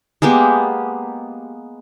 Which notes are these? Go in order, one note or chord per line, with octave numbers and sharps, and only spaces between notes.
G#3 A#3 B3 G4